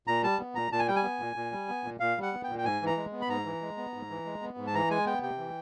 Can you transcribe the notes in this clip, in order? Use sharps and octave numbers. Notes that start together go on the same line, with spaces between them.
A#2 A#5
G3 A5
B3
A#2 A#5
A#2 A5
G#5
G3 G5
G#5
B3
A#2
A#2
G3
B3
A#2
A#2 F5
G3
F#5
B3
G5
A#2
G5
G#2 G#5
E3
A#5
G#3
B3
B5
G#2 A#5
E3
G#3
B3
G#2
E3
G#3
B3
G#2
A5
E3 A#5
G#3 G#5
B3 G5
C3 G5
E3